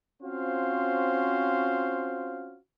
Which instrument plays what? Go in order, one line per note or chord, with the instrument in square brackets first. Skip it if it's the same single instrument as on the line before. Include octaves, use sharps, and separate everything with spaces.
[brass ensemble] C4 C#4 F4 F#4 C5 F5